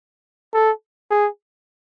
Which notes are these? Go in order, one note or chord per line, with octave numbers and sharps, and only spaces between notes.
A4
G#4